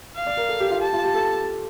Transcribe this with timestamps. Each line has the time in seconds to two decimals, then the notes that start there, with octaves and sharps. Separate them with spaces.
0.16 F5
0.27 D5
0.37 A#4
0.49 A4
0.60 G4
0.70 F4
0.81 G4 A5
0.93 F4
1.04 G4
1.14 A4